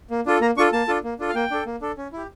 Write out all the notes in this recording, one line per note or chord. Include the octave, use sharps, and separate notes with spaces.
A#3
D4 F4 A4
A#3 A#5
D4 F4 A4 C#6
A#3 A5
D4 F4 A4
A#3
D4 F4 A4
F5
A#3 G5
D4 A4
A#3
D4 A4
C#4
E4 G4